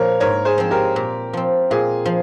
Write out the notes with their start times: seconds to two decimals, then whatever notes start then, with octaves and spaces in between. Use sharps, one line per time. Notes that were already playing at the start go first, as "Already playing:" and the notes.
Already playing: A#2 F3 A#3 A#4 C#5
0.20 G#2 A#4 C#5
0.45 G#4 C5
0.58 F3 C4
0.71 G4 A#4
0.96 A#2
1.33 F3 C4
1.70 A#2 F4 G#4
2.06 F3